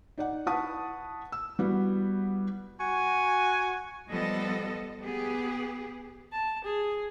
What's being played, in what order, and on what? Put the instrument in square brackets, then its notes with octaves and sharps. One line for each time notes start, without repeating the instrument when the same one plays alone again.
[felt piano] D#4 D5 F#5
E4 B4 F#5 A5 C#6 D#6
E6
G3 B3 E4 F#4
[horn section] F#4 G#5
[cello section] F3 G3 B3 A4 D#5
B3 G4 G#4
[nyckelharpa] A5
G#4